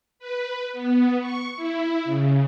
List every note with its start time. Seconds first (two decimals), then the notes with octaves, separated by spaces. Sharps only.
0.19 B4
0.73 B3
1.20 C#6
1.56 E4
2.04 C#3